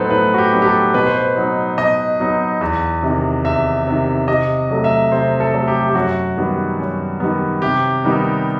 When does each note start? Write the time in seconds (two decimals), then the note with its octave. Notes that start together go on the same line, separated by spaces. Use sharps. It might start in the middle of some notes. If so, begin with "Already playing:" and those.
Already playing: A2 F#3 B3 D#4 A4 B4 C5
0.10 A2 B4
0.34 F#4
0.38 G4
0.52 F#3 B3 D#4
0.62 G4
0.66 A4
0.94 B2 B4
1.07 C5
1.18 B4
1.36 F#3 B3 D#4
1.78 B2 D#5
2.19 F#3 B3 D#4
2.61 E2
3.03 C3 D#3
3.45 E2 E5
3.87 C3 D#3
4.28 C3 D#5
4.70 F#3 A3
4.84 E5
5.11 C3 C5
5.40 A4
5.53 F#3 A3
5.68 G4
5.89 G4
5.95 F#2 F#4
6.37 D#3 G3 B3
6.79 F#2
7.20 D#3 G3 B3
7.62 C3 G4
8.04 D#3 G3 B3 D#4